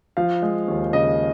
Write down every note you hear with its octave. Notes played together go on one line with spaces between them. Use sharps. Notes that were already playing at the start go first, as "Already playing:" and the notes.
F3 F5
G#3
D#2
C#3 D#5